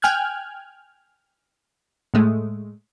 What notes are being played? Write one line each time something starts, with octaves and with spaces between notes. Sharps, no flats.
G5 G#5 F6 F#6 G#6
A2 G#3 A3